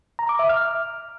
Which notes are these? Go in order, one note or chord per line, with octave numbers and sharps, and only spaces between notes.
A#5
D6
E5
F6